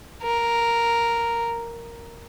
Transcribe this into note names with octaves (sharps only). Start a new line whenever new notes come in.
A#4